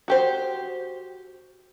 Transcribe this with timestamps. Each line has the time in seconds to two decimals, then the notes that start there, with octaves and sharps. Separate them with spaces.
0.08 F#4 G4 C5